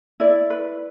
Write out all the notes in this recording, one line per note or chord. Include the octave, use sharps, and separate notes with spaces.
E4 D5
B4